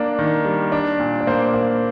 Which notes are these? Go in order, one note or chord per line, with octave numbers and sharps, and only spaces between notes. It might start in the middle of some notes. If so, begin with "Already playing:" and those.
Already playing: A#3 D4 D5
D#3
G3
D4
A#2
D5
A#3 C5
A#3